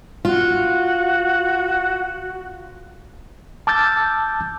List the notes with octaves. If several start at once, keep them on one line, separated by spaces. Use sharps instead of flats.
F4 F#4
A5 D6 E6 F6 G6 A6